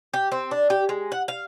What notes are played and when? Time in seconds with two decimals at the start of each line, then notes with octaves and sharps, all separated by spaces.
0.14 G4
0.32 C4
0.51 D4
0.70 G4
0.89 G#3
1.12 F#5
1.28 F5